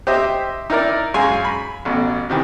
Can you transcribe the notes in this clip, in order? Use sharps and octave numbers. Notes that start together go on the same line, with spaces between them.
G4 C5 D#5 E5
D#4 E4 A#4 D5
F#2 G#3 F5 G#5 C6
B5
A1 B2
C3 D#3 E3